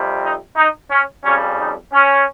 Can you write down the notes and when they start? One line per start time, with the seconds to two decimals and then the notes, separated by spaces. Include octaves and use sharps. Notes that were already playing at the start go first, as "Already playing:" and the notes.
Already playing: F2 C3 G3 C4
0.23 D#4
0.57 D#4
0.91 C#4
1.24 F2 C#3 G3 C#4
1.58 D#4
1.93 C#4